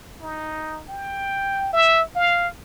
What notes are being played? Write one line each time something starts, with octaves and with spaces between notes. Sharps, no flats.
D#4
G5
E5
F5